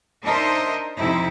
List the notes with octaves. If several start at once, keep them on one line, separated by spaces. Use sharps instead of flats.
D4 D#4 A#4 C5 D#5 E5
F2 C3 D#4 E4